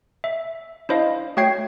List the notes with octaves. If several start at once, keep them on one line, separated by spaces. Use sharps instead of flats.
E5
D4 E4 C5 D#5 F5
A3 F#4 C#5 G5 G#6 C7